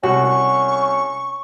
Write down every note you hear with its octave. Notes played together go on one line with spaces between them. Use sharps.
C2 C#4 F#4 C#6